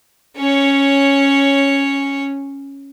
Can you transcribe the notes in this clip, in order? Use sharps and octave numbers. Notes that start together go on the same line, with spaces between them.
C#4 C#5